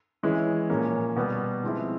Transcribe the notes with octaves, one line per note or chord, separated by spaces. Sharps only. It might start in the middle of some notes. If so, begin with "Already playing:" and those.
E3 G#3 C#4 E4
A#2 F3 A#3 C#4
B2 G3 B3
F3 G#3 C4 E4